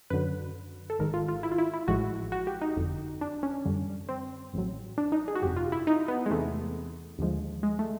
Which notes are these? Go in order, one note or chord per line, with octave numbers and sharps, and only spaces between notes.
F#2 D3 F#3 B4
A4
G#1 G#2 D#3 G#3 A#4
F4
F4
E4
F4
E4
E4
A1 A2 F3 G#3 F#4
F#4
G4
D#4
G1 F2 D3
D4
C#4
F#2 D3 G3
C4
A1 A2 F#3
D4
D#4
G#4
F#4
G1 F2 C3 G4
F4
E4
D#4
B3
G#3
E2 C3 E3 A3
D#2 D3 F3 G#3
G#3
A3